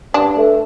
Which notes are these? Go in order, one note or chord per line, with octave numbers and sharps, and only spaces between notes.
G2 D4
A3